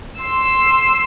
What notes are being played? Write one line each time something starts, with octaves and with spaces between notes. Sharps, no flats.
C6 E6